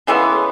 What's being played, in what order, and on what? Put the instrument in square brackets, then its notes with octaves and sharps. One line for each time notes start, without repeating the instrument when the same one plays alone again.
[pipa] C#3 E3 G#3 B3